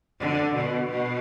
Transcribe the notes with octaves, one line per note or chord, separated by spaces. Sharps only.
D3
B2
B2